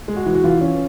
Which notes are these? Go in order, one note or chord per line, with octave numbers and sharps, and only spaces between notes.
G#3
F#4
E3
F#4
E3 F4
C#4